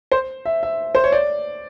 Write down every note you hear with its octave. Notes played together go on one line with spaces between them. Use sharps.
C5
E5
E5
C5
C#5
D5